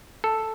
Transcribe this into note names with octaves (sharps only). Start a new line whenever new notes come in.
A4